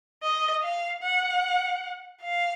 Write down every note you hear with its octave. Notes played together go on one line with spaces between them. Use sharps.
D#5
F5
F#5
F5